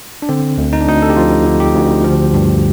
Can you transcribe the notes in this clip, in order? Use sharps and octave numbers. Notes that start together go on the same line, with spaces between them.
D4
D3 C4
D2
D#4
D4
D2 D#4
A4
G4
F3 F4
D3
G4
D2
F3
G2